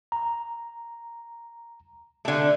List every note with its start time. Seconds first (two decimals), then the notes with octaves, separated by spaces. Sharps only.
0.12 A#5
2.25 D3 A3